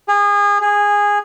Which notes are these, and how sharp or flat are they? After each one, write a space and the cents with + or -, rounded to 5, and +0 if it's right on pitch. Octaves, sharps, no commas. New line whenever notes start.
G#4 -30
G#4 -15